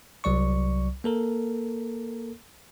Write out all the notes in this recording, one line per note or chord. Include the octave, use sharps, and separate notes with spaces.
C2 F#3 D5 C#6
A#3 A4 A#4